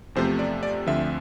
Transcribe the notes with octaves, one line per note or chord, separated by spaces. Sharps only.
E2 C3 F3 A3 C5
D5
D5
D2 D3 F3 C4 E5